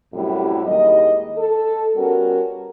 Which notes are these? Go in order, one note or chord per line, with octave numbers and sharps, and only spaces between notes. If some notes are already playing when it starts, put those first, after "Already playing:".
F#2 A2 C3 G3 E4
D#2 G#3 D#5
A4
G3 B3 C#4 F#4 A#4